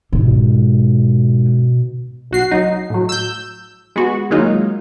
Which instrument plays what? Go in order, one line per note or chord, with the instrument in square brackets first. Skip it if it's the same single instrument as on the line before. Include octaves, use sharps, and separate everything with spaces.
[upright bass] G#2 [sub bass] B2
[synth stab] B1 F#4 C7
F#3 D#4
A2 F#3
E6 G6
G#3 B3 F#4
D#3 F#3 G#3 A#3 D#4 F4